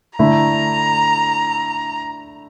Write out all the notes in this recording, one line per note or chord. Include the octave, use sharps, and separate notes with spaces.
D3 A3 E4 A#5